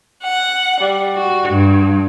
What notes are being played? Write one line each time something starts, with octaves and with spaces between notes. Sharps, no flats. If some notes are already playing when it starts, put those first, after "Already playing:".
F#5
G3
F#4
G2